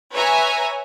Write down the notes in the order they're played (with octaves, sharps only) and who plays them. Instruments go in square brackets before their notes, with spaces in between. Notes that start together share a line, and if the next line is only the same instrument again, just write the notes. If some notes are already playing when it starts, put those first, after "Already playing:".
[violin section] B4 C#5 E5 G#5 A#5